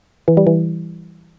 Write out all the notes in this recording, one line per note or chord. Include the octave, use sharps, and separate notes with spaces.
E3
G3
E3